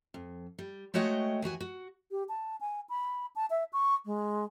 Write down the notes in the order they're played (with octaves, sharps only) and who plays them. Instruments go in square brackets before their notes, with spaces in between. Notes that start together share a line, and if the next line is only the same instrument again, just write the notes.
[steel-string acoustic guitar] F2
G3
G#3 A3 F#4 C#5 D#5 G5
D#2 E3 F#4 G#5
F#4
[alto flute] G4
A5
G#5
B5
A5
E5
C#6
G#3